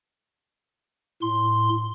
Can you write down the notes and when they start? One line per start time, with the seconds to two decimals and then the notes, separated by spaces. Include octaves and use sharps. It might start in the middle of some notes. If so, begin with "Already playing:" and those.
1.22 A2 C6